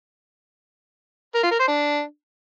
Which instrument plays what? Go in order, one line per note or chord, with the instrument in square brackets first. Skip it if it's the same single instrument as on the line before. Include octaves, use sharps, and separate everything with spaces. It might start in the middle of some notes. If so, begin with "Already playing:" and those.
[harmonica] A#4
F4
A#4
C5
D4